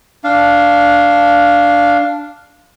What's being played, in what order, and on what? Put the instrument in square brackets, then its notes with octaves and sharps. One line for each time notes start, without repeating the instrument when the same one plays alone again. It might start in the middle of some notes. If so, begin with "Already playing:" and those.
[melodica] D4 F5